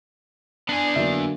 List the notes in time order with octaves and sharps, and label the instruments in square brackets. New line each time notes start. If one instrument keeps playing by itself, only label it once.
[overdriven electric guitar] B3 G#5 [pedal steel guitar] D4
[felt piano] D3 F#3 A#3 [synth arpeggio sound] E5